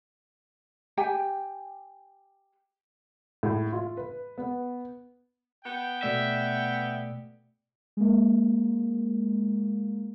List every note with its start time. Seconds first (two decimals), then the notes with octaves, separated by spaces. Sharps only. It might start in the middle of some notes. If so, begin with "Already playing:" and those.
0.97 G4 G5 G#5
3.43 A2
3.73 F4
3.97 B4
4.38 B3
5.64 B3 F#5 G5
6.03 B2 A3 D5 E5
7.97 G#3 A#3